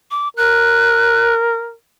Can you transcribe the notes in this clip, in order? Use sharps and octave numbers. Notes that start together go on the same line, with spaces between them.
D6
A#4 F#6